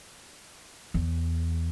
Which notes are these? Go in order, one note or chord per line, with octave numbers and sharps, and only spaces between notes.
E2